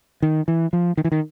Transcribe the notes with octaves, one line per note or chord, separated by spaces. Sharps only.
D#3
E3
F3
D#3
E3
D#3